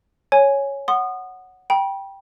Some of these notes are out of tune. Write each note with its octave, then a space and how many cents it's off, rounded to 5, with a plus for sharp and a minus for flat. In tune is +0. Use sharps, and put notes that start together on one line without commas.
C#5 +0 G#5 +0
F#5 +0 C6 +0 D#6 -25
G5 +0 B5 -40